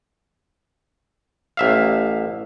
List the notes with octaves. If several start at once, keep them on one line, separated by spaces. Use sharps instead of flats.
A1 E5 F5